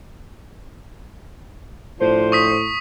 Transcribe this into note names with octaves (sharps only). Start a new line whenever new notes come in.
A2 F3 D4 C5
C#6 D#6 B6